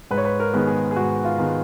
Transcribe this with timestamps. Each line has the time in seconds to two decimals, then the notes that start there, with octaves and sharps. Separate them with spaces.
0.11 G#2 B4
0.18 C#5
0.25 B4
0.40 A#4
0.54 D#3 G#3 B3
0.67 G#4
0.91 G#4
0.96 G#2 F#4
1.25 F4
1.38 D#3 G#3 B3